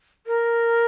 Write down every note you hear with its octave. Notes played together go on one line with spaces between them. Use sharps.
A#4